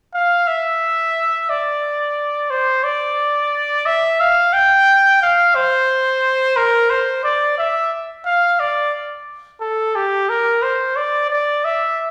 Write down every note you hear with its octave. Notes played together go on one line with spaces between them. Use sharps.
F5
E5
D5
C5
D5
E5
F5
G5
F5
C5
A#4
C5
D5
E5
F5
D5
A4
G4
A#4
C5
D5
D5
E5